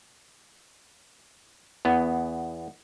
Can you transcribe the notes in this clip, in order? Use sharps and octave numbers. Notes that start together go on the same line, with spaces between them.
E2 B3